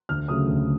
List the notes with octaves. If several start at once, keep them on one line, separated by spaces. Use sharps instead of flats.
D2 F6
C#3 F#3 A3 D#6
D2